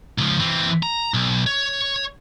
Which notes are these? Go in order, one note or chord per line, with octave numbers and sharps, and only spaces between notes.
C#2 F3
E3 C4
A#5
B1
C#5